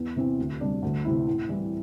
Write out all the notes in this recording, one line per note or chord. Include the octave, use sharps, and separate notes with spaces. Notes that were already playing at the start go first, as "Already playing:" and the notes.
Already playing: E2
C3 E3 C4
D2
C3 G3 D4
D2
C3 E3 C4 E4
A2
E3 G3 E4